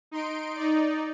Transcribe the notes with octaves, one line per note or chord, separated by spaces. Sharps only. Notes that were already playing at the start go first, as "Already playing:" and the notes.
D#4 C6 D7
D#4 D5